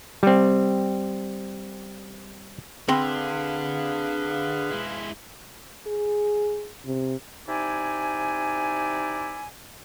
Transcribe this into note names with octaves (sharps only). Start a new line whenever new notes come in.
G3 C4
D3 C4 G#4 B4 F5 B5 C6
G#3 E4
G#4
C3
C3 D#4 E4 D5 G#5